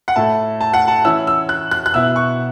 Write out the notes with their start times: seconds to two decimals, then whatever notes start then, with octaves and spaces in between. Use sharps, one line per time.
0.08 F#5
0.16 A2 A3 E4 A5
0.61 A5
0.74 F#5
0.88 A5
1.04 E3 C#4 E4 E6
1.27 E6
1.49 F#6
1.71 F#6
1.86 F#6
1.94 B2 B3 E4 E6
2.16 C#6